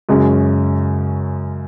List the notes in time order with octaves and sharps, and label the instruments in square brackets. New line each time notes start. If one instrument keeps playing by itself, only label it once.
[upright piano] F#2 C#3 G#3 C#4